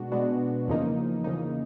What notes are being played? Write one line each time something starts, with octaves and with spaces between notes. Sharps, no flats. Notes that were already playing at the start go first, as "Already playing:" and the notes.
Already playing: B2 G#3 B3 D4 F#4
B2 G#3 B3 D4 F#4
E2 C#3 F3 A#3 D#4
E2 C#3 F3 A#3 D#4